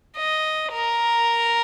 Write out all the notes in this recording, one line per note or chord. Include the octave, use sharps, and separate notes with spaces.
D#5
A#4